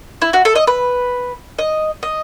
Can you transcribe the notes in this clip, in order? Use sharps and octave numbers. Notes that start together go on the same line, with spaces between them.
E4
F#4
A4
D#5
B4
D#5
D#5